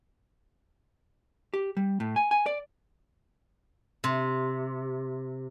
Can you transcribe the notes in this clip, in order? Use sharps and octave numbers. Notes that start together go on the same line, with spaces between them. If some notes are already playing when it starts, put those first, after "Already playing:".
G4
G3
A2
G#5
G#5
D5
C3